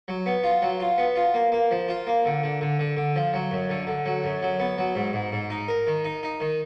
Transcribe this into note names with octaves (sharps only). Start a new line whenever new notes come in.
F#3
B3
F4
F#3
F4
B3
F4
A#3
A#3
F3
F4
A#3
D3
D3
D3
D3
D3
F3
F#3
F#2
D3
D3
F#3
F#2
F#3
B3
F#3
G#2
G#2
G#2
D#4
A#4
D#3
D#4
D#4
D#3